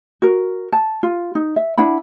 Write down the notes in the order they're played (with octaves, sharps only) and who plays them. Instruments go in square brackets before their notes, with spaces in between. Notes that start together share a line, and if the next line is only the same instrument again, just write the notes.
[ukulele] F#4 A#4
A5
F4
D#4
E5
D4 E4 F#5 B5